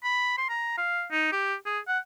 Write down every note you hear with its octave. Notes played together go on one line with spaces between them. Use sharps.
B5
C6
A#5
F5
D#4
G4
G#4
F#5